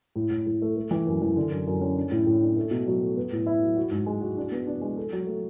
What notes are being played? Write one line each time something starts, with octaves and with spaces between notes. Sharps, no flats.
A2
A2
A2
A3
A3
E3
F#2
E3
D3
F#2
F#2
C#4
D4
A2
A2
D4
A3
B2
F#3
A3
B3
A2
E4
F#3
F#4
G#2
G#3
F#4
D4
B3
D4
G#3
A4
F#3
A3